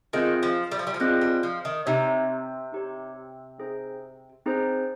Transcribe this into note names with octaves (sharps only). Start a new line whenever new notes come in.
D#3 C4 F4 G#4 D#5
F3
G3
F3
G3
F3
G3 C4 F4 G#4 D#5
G3
F3
D#3
C3 D#4 G4 C#5
D#4 G4 C#5
C4 D#4 G#4 C5
C4 D#4 G#4 C5